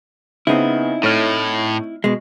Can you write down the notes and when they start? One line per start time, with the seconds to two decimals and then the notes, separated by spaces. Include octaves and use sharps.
0.47 C#3 B3 C4 D#4 E4
1.03 A2 A3 C#5 F6
2.04 B2 G#3